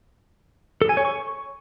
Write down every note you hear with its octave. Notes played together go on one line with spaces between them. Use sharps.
A4
G#5
C#5
C#6